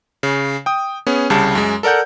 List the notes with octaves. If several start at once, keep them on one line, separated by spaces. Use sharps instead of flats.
C#3
G5 D#6
B3 C#4 G#4
C2 C#3 G3 A5
F#2 G#3
A4 A#4 D5 F#5 G6